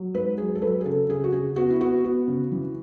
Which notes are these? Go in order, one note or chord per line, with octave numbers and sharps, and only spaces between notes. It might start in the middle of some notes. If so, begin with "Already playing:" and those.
Already playing: F#3
G#2 B4
F#3 G#4
A4
F#3 B4
G#4
C#3 A4
C#3 G#4
F#4
C#3 G#4
B3 F#4
E4
B3 F#4
B3 F#4
C#3
E3